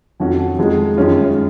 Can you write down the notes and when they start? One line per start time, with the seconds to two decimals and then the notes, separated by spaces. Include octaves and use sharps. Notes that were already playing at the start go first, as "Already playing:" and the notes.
0.20 F2 D#3 F#3 C#4 F#4
0.58 F2 D#3 G#3 D#4
0.97 F#2 D#3 G#3 C#4 F4